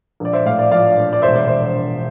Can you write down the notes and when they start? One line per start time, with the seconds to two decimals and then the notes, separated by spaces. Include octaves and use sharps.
0.20 A#1 D5
0.33 C5 E5
0.45 A2 D5 F5
0.59 D5
0.71 F3 D5 F5
0.97 A#1
1.13 D5
1.22 E1 C5 E5
1.36 D5
1.48 C5